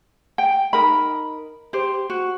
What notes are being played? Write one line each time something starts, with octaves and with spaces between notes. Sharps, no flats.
G5
D#4 A#4 B5
G4 C5
F#4